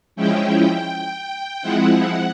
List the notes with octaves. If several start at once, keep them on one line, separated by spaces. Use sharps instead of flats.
F3 G#3 C#4 E4 G5
F3 G#3 C4 E4 F#5